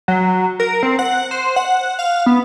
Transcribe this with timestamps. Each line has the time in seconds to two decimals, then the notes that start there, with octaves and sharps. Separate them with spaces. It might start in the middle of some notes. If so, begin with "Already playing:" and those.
0.08 F#3
0.60 A#4
0.83 C4
0.99 F#5
1.31 C5
1.56 F#5
1.99 F5
2.26 B3